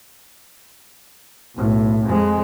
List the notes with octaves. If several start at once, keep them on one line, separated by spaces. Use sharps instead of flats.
B1 A2
F2 G#3